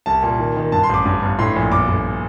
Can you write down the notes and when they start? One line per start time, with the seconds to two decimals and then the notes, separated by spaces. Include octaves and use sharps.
0.06 C2 A5
0.23 A#2
0.39 D#3
0.56 D#3
0.72 G2 A5
0.83 C6
0.89 A1 D6
1.05 G2
1.22 G1
1.39 A2 C6
1.56 A#1
1.72 G1 D6
1.88 G1